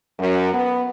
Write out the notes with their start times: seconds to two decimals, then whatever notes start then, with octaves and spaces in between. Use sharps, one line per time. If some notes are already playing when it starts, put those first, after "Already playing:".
0.19 F#2
0.54 B3